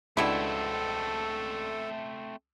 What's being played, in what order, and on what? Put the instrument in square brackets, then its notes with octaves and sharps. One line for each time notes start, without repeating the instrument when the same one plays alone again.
[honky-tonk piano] C#2 D4 E7 [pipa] B2 E4 [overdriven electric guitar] A3 C4 [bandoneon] A4